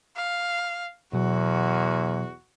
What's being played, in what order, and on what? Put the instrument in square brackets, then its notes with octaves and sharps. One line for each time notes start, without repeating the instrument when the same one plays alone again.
[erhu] F5
[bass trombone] E2 [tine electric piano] B2 F#3 [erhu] F#4